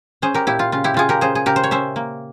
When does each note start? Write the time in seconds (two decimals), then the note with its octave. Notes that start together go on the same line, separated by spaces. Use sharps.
0.22 C#4 G#4 C5
0.34 G4 A#4
0.47 A#2 E4 G4
0.59 F4
0.72 C#3 F4
0.84 E4 G4
0.94 C#3 F4 G#4
1.09 G4 A#4
1.21 C#3 G#4 C5
1.35 G#4
1.46 C#3 G4 A#4
1.56 C5
1.63 C#5
1.71 C#4 C5 E5
1.96 A#3